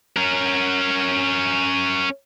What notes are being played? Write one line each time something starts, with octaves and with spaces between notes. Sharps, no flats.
C#4 A#4